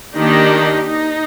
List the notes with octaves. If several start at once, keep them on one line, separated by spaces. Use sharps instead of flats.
D#3 A#3 D4 D#4 G4
D#4